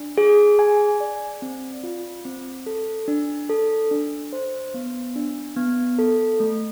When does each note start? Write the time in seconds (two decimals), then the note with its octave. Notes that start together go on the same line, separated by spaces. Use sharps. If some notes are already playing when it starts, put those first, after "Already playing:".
Already playing: D4
0.18 G#4
0.59 G#5
1.00 D5
1.42 C4
1.83 F4
2.25 C4
2.66 A4
3.08 D4
3.50 A4
3.91 D4
4.33 C5
4.74 B3
5.15 D4
5.57 B3
5.99 A4
6.40 A3